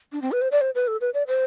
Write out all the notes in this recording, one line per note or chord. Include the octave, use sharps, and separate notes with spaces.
D4
C4
B4
C5
D5
C5
B4
A4
B4
D5
C5